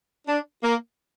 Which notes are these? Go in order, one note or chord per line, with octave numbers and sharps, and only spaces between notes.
D4
A#3